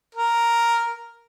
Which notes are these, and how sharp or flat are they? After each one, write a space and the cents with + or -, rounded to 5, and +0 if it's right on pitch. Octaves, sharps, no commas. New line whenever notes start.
A#4 +0